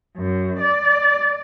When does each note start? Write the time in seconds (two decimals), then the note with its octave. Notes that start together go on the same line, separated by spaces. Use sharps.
0.16 F#2
0.60 D5